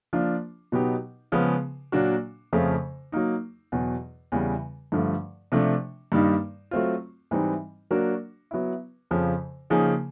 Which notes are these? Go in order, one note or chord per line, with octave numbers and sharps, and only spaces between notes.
F3 A#3 D4 F4
B2 F#3 B3 D#4 G4
C#3 F3 G#3 B3
A#2 F#3 A#3 D4 F#4
F2 C#3 F3 A3
F#3 A#3 D#4
E2 B2 F#3
E2 C#3 E3 G3
G2 D3 F3 A3
C3 F3 A3 D4
G2 D#3 G3 A#3 D#4
F#3 A3 C4 F4
G#2 E3 G3 C4 D#4
F#3 A#3 D4 F#4 A#4
F#3 B3 E4
F2 C#3 F3
C#3 F3 A#3 D#4 G#4